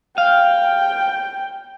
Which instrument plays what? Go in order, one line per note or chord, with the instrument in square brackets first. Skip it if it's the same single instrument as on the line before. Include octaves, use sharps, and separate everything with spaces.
[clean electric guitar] F5 [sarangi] G5